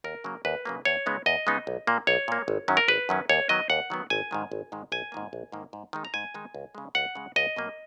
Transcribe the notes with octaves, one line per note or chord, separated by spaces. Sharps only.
D#2 A#4
C#3 F#3 A#3
D#2 B4
C#3 F#3 A#3
E2 C#5
C#3 G#3 B3 D#4
E2 D#5
C#3 G#3 B3 D#4
B1
A#2 A#3
B1 C#5
A#2 A#3
G#1
F#2 D#3 F#3 C#4
A#4
G#1 B4
F#2 D#3 F#3 C#4
D#2 C#5
D#3 F#3 B3 D#5
D#2 F#5
D#3 F#3 B3
G#1 G#5
G#2 D#3 G#3
G#1
G#2 D#3 G#3
A#1 G#5
G#2 D#3 A#3
A#1
G#2 D#3 A#3
G#2
D#3 G#3 D#4
A#5
G#2 G#5
D#3 G#3 D#4
C#2
C#3 G#3
C#2 F#5
C#3 G#3
C#2 D#5
B2 F#3 A#3